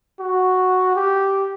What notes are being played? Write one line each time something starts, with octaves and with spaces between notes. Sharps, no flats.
F#4
G4